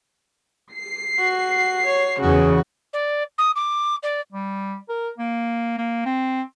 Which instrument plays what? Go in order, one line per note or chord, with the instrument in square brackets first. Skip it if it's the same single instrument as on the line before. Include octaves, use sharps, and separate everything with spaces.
[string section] C7
[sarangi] F#4
C#5
[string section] E2 C#3 [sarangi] F#4
[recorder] D5
D#6
D6
D5
[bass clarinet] G3
A#4
A#3
A#3
C4